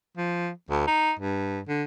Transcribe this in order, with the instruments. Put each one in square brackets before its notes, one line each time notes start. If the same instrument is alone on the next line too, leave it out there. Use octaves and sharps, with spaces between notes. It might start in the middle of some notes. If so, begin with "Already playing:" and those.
[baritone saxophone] F3
D2
D#4
G2
D3